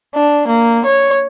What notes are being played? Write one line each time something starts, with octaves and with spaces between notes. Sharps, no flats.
D4
A#3
C#5